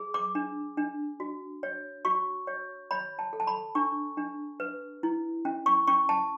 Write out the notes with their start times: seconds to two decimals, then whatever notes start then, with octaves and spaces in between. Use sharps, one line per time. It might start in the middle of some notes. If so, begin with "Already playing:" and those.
Already playing: G#4
0.14 D6
0.35 D4
0.77 D4
1.20 F#4
1.63 C#5
2.05 F#4 C#6
2.47 C#5
2.91 C#5 B5
3.19 A5
3.33 A4
3.40 A5
3.47 B5
3.75 D4 C#6
4.17 D4
4.60 B4
5.03 E4
5.45 C#4
5.66 C#6
5.87 C#4 C#6
6.09 A5